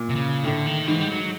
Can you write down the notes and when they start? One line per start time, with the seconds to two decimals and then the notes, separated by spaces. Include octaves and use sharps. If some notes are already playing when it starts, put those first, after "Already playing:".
Already playing: A#2
0.09 C3
0.15 C#3
0.44 A2 D3
0.66 D#3
0.87 G#2 E3
1.01 G3
1.09 F#3